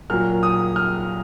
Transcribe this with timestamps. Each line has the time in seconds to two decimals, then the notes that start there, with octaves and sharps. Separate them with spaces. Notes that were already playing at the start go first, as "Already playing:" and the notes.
0.10 A#2 F#3 F6
0.43 D#6
0.76 F6